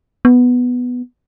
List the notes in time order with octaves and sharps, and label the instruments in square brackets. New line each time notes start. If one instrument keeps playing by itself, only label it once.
[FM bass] B3